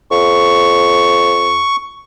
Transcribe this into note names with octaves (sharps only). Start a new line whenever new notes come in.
F2 C#6